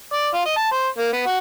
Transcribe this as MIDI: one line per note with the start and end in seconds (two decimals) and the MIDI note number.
0.13 0.28 74
0.34 0.44 65
0.46 0.53 75
0.57 0.71 81
0.72 0.88 72
0.98 1.12 58
1.13 1.25 59
1.26 1.38 66